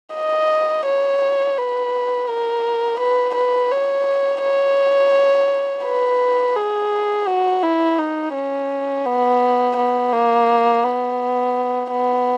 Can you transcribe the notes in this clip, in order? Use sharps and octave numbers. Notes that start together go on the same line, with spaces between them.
D#5
C#5
B4
A#4
B4
B4
C#5
C#5
B4
G#4
F#4
E4
D#4
C#4
B3
B3
A#3
B3
B3